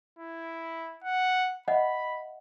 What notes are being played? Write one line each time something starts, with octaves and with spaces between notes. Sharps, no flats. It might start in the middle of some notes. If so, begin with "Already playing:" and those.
E4
F#5
D#5 E5 F#5 B5